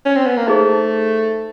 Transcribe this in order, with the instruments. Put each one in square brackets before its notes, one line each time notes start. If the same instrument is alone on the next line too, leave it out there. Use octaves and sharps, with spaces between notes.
[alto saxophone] C#4
C4
B3
A#3
[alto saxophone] A3 [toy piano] D#4 G#4 C5